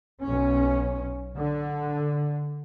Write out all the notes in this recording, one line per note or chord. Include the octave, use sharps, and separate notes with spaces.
B1 C#4
D3